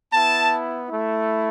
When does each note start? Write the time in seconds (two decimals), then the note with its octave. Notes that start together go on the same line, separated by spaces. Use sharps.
0.13 B3 E4 A5
0.88 A3 E4